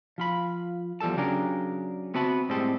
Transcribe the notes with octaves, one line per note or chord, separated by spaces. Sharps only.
F3 F4 B5
E2 F3 G3 A4 A5
C#3 F#3 D4 G4 G#4 A#4
B3 C4 F#4 E5 A5 B5
A2 G3 G#3 C4 G4 A4